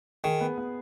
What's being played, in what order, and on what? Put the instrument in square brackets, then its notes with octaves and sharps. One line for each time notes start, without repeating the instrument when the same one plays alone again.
[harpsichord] D#3 [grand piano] G#4
[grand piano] B3
B3